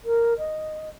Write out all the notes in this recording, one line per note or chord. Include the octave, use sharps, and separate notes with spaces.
A#4
D#5